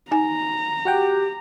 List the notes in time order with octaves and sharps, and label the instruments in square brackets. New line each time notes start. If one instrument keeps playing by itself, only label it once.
[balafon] D#4 G#5 [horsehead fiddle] A#5
[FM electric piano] F#4 F#5 G5 [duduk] G4